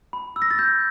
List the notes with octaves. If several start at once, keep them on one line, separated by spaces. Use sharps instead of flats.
B5
E6
A#6
A6
G6